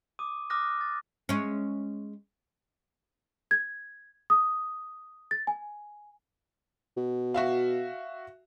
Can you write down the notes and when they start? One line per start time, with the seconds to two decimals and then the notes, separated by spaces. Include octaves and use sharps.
0.19 D6 D#6 D#7
0.50 D6 D#6 F6 F#6 A#6
0.81 A6
1.29 G#3 C#4
3.51 G#6
4.30 D#6
5.31 A6
5.47 G#5
6.97 B2
7.34 F#4 E5 F5